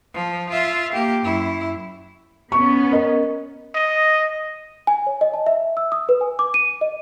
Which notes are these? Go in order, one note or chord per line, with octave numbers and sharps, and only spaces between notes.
F3
F4 E5
A#3 G4
F#2 E4
B3 C#4 C#6
A#4 D#5
D#5
G#5
C#5
D#5
A5
E5
E6
D#6
B4
G#5
D6
D#7
D#5